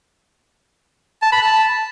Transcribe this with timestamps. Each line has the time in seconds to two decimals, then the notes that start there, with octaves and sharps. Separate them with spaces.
1.22 A5
1.32 B5
1.42 A5